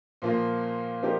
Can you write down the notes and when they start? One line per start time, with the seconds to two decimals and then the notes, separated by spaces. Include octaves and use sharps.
0.22 A#2 F3 A#3 F4
1.02 F3 C4 D#4 G4 A#4